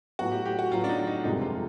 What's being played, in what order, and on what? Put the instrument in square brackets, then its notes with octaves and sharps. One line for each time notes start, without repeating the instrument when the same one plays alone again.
[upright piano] A2 F#3 B3 [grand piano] F#4
[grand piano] G4
G4
F#4
[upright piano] A2 F#3 B3 [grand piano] F4
[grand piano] D4
D#4
D#4
[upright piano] G1 F2 C3 F3 G#3 [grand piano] D#4
[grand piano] F4